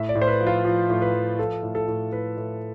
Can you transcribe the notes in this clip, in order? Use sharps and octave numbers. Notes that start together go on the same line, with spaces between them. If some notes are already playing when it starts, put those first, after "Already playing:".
Already playing: A2 E5
D5
A2
C5
B4
F3
F4
F3
A2
B4
F3
F3 A4
A2
A4
A2
A2 B4
A2